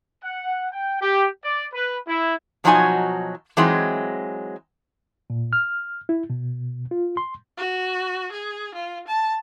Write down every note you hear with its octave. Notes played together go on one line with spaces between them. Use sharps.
F#5
G5
G4
D5
B4
E4
B2 F3 F#3 D#4 F#4 G#5
E3 F#3 G#3 C4 D#4
A#2
F6
E4
B2
F4
C6
F#4
G#4
F4
A5